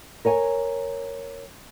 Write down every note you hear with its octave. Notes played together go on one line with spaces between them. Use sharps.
A#4 C#5 G#5